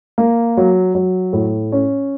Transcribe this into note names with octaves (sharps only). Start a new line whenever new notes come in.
A#3
F#3
F#3
A2
C#4